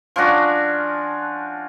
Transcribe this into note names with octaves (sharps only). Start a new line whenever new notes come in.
F3 C#4 D4 F#4